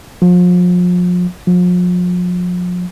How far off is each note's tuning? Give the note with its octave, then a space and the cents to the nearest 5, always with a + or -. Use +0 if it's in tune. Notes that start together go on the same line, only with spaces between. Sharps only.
F3 +35
F3 +40